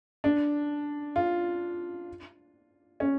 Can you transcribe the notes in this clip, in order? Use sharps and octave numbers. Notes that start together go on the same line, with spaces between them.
D4
F4
C#4